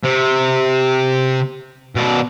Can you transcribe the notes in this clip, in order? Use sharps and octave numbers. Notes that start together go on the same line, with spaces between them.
C3
B2 D5